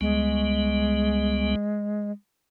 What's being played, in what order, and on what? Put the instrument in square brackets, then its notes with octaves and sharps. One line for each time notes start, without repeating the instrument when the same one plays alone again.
[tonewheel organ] C#2 G3 B3 [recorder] G#3